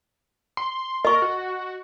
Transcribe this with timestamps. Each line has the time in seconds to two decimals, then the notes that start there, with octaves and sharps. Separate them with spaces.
0.57 C6
1.05 A#4 D#5 C#6
1.22 F#4